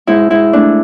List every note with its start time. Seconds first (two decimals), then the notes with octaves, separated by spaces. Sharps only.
0.07 G#2 E4
0.30 G#2 E4
0.53 A3 D4